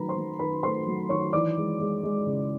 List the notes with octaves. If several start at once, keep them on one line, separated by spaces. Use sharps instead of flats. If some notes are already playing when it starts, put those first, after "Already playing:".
Already playing: D#3 F#3 A3 B4 A#5 B5
C5 C6
F#3
D#3 B4 B5
A3 C5 C6
F#3
D#3 C#5 C#6
E3 D5 D6
G#3
G#3
G#3
C#3